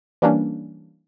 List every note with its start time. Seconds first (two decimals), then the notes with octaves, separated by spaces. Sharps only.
0.22 E3 G3 A#3 C#4 D4